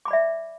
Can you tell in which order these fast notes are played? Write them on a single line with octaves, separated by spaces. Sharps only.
D6 B5 D5 E5